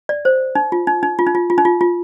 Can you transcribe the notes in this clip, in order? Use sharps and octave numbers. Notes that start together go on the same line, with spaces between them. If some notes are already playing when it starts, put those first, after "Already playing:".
D5
C5
D#4
F4
D#4
D#4
F4
D#4
F4
F4
D#4
F4
F4